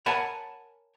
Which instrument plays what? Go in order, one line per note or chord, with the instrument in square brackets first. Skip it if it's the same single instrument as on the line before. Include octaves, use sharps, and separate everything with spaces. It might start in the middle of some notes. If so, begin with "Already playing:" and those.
[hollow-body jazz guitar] A#4 C#5 F#5 G#5 A5 B5